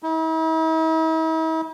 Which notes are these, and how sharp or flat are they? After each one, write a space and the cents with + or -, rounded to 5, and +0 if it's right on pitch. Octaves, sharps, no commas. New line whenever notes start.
E4 -45